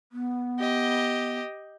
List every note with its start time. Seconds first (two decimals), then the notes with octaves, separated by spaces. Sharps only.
0.12 B3
0.59 G4 D#5